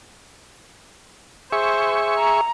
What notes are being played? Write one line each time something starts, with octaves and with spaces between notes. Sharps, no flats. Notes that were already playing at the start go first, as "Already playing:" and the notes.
G#4 C5 E5 C#6
A#5